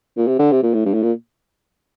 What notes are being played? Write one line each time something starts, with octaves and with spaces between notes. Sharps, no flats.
A#2
C3
D3
C3
A#2
A2
G2
A2
A#2